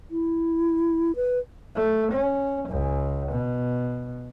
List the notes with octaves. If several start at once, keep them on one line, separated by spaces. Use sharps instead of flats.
E4
B4
A3
C#4
C#2
B2